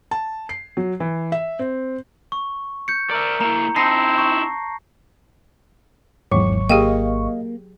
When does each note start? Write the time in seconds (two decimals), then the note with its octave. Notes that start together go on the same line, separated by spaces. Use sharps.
0.11 A5
0.49 C7
0.77 F#3
1.00 E3
1.32 E5
1.59 C4
2.32 C#6
2.88 G6 C#7
3.11 A#4 D5 E5
3.41 A#3 E4 A#5
3.76 C4 D#4 E4 A5 A#6 C7
4.18 C#6
6.31 G#1 E2 G#2 F#3 C#6
6.69 A#3 G4 G#4 D#5 F5 G5